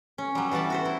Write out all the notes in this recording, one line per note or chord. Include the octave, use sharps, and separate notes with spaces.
C#4
F#3 G3
E3 G3 B3 A5 B5
F#4 B4 C5
E4